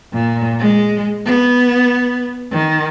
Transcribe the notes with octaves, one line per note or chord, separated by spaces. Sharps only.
A#2
G#3
B3
D#3